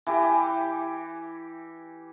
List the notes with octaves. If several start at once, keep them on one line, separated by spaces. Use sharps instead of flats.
E3 G4